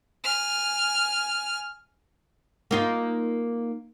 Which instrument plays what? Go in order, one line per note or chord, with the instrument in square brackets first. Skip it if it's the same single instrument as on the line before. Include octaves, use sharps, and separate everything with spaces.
[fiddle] G#5 F6
[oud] A#3 D#4 F4